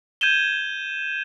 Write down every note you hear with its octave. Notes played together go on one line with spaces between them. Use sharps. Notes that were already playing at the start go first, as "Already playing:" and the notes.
G6 G#6 D#7 E7 G7